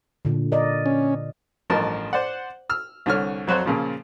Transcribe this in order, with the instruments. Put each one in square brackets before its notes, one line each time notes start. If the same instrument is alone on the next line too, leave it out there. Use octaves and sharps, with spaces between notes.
[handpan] A#2 D3
A#4 D5 D#5
[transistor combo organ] C#4
[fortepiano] A1 G2 F3 A#4 D#5 A5
C5 D5 F#5
E6 F6
C2 D3 C#5 F6
F2 F#3 F#4 C5
A#2 C#3 F3